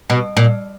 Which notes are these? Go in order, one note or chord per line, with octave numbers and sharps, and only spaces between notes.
B2
A#2